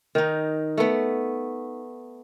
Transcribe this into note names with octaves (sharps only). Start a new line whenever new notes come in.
D#3 D#4
A3 B3